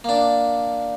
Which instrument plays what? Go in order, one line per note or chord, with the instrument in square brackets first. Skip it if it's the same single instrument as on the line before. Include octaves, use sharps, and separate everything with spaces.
[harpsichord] A#3 D4